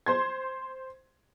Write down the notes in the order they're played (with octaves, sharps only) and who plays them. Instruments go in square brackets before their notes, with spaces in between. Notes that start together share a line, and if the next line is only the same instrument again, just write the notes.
[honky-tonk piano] C5 C6 G#6